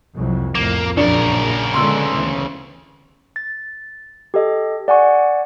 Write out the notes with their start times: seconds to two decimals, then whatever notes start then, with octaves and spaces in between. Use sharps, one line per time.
0.15 C2 F2 F#3
0.55 C2 F2 A2 A#3 E7
0.97 A#1 F#2 C#3 D4 A#4
1.74 D3 G#3 B3 C6 E6
2.12 D2 E3
3.36 A6
4.34 G4 A4 D#5
4.88 D5 F#5 G#5 C#6